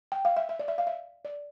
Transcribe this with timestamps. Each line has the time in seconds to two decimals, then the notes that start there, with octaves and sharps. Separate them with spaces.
0.12 G5
0.25 F5
0.37 E5
0.49 E5
0.59 D5
0.68 E5
0.78 F5
0.87 E5
1.25 D5